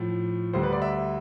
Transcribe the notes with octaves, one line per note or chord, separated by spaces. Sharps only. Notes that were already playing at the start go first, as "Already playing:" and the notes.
Already playing: A2 F3
D2 D3 G3 C5
B4
D5
E5